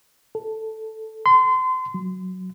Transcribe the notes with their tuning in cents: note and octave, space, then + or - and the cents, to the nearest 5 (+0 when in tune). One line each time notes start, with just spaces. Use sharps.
A4 +0
C6 -30
F#3 +0